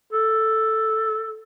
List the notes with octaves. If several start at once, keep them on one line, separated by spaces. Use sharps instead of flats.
A4